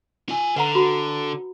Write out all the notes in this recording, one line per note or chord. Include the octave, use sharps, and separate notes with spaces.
F4 G#5
D3 B4 F#5 A#5
F#4 B5